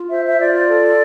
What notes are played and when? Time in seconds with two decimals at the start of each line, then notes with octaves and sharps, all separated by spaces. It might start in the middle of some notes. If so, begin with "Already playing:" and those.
Already playing: F4
0.09 C5 E5
0.24 E5
0.39 F4 D5
0.53 D5
0.67 A4